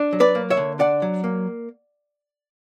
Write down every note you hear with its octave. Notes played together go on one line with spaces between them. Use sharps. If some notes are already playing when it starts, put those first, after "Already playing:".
Already playing: D4
F#3
B4 D5
A#3
C#5 E5
D3
D4 D5 F#5
F#3
A#3